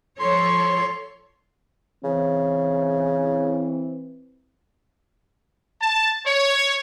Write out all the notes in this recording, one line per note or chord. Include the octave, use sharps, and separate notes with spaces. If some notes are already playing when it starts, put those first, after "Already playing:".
F3 A4 C#5 C6
C#3 E3 C4
A5
C#5